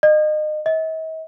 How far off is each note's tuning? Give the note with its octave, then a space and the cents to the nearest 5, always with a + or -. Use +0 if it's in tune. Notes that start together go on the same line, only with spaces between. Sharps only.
D#5 -30
D#5 +45